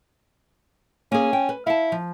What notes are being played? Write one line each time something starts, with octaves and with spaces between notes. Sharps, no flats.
A#3 C#4 G#4
G5
B4
E4 F5 A5
F3